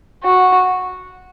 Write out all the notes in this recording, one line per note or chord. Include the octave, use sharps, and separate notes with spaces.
F#4